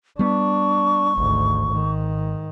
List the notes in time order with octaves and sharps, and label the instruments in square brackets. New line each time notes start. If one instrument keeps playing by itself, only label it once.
[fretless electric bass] G3 B3 [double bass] D4 [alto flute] C#6
[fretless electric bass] G#1 [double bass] D2 G#2
[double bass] G#2 D#3